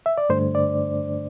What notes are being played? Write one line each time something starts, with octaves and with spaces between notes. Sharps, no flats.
E5
D5
G2 D3 A3 D4 C5
D5